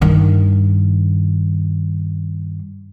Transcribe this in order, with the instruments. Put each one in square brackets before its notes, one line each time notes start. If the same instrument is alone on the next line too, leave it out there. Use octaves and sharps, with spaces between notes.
[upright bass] G2 D#3